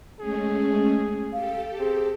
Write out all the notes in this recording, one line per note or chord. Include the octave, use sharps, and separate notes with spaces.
G#3 A3 C#4 G#4
G4 A4 F5
C4 G#4